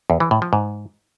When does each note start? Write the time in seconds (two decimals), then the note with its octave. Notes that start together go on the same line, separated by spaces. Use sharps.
0.10 E2
0.20 E3
0.31 A2
0.42 F3
0.53 G#2